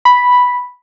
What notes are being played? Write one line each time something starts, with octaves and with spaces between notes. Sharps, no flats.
B5